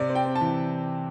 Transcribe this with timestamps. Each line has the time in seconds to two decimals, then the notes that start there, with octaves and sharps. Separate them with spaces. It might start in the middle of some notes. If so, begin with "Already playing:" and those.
Already playing: C3 D5
0.10 C4
0.15 G5
0.25 C4
0.36 A5
0.41 E3